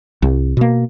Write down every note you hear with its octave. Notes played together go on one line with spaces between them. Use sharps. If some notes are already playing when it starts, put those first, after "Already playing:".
C2
B2 A#3